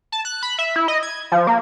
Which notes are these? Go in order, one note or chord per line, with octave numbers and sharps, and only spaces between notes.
A5
F#6
B5
E5
E4
D#5
G#6
F3
A#3